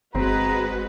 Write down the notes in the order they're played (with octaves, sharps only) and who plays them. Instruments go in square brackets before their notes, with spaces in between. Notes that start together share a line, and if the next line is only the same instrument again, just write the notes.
[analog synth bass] G1 [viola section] G#3 F#4 B4 [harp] C4 [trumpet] A#5